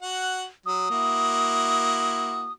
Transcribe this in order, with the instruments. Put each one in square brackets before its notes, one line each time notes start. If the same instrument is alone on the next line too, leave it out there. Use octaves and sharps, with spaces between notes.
[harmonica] F#4 F#5
[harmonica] F#3 [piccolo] D#6
[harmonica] A#3 E4 F#4